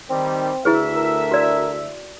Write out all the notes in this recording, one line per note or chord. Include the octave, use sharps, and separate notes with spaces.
D#3 G3 C4
D2 E4 G#4 B4 E5
A#4
F#4 D5